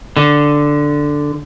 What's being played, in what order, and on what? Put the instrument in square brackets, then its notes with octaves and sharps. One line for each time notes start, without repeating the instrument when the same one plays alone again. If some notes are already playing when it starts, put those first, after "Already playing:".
[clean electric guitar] D3